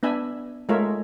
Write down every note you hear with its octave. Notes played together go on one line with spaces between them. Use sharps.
B3 D4 E5 G#5 B5
G#3 A3 F4 A#4 C#5 E5